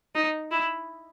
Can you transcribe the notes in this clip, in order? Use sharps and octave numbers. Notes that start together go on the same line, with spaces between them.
D#4
E4